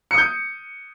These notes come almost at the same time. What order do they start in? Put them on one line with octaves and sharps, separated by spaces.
C#7 D#6 G6